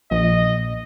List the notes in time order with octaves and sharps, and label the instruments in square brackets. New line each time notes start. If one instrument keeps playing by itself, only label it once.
[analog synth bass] A#1 [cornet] D#5